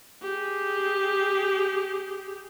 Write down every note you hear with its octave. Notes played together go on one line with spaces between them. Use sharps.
G4 G#4